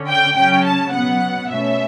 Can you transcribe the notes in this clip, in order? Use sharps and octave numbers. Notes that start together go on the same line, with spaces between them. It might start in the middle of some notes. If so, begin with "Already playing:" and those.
Already playing: D3 C#4
G5
C#3 F#3 C#4 G5
A5
B2 F#3 B3 F#5
B2 A3 C#4 E5